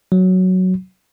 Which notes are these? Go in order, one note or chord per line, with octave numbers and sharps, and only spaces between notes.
F#3